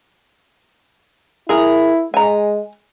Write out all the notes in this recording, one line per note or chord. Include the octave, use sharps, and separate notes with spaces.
E4 G#4 A#4
G#3 G#5 A#5